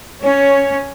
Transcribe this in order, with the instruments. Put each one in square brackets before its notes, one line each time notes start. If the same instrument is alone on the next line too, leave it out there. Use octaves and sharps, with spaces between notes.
[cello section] C#4 [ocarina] C#5